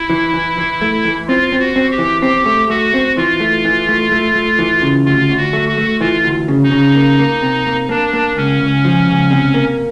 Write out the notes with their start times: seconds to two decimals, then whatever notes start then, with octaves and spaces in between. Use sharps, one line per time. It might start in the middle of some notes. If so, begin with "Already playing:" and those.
Already playing: E4
0.10 E3
0.34 E3
0.58 E3
0.82 A3
1.04 E3
1.28 C4 F4
1.52 C4
1.60 F#4
1.76 C4
1.91 G4
1.98 E3
2.22 C4 G4
2.46 A3
2.70 A3 F#4
2.94 C4
3.17 E3 F4
3.40 A3
3.65 E3
3.89 A3
4.12 A3
4.35 A3
4.59 E3
4.82 C#3
5.06 D2 F4
5.29 D2
5.38 F#4
5.53 A3
5.69 F#4
5.78 A3
6.00 E3 F4
6.24 D2
6.48 C#3
6.63 D#4
6.71 C#3
6.95 A#3
7.19 A#3
7.42 C3
7.66 A#3
7.89 A#3 D4
8.13 A#3
8.37 C#2 C#4
8.61 C#2
8.85 F3
9.08 C#2
9.31 C3
9.54 A#3